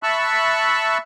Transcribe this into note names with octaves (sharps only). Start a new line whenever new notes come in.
E5 A5 B5 C#6 E6 F#6